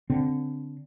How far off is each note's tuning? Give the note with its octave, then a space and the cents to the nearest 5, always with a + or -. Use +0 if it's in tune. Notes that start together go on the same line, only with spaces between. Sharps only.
D3 -20 C4 -15